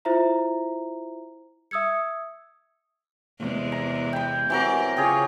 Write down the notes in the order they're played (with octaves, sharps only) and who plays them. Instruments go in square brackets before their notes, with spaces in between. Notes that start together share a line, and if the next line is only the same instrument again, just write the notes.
[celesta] E4 F4 C5 E5 A#5
E5 D#6 E6 G#6 C#7
[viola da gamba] E2 C3 G#3
[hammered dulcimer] A#5
G5 B5
[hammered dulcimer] E3 F#3 A#4 [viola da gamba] C4 G4
[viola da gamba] C#3 F4 [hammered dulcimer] G4 G#4 C#5